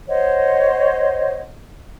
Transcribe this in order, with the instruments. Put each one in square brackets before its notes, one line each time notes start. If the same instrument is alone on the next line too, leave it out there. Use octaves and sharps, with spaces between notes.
[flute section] C5 C#5 D#5 F#5